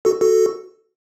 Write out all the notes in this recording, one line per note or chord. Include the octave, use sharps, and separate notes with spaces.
F#4 A4
F#4 A4